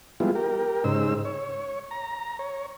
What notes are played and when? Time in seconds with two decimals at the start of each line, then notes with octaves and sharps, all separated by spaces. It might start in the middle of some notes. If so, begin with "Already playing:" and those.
0.20 F3 G3 G#3 B3 E4 F4
0.35 G4 A#4
0.84 G#2 C#3 D#4 C5 E6
1.25 C#5
1.91 A#5
2.39 C#5